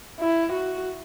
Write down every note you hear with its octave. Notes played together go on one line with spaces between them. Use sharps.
E4
F#4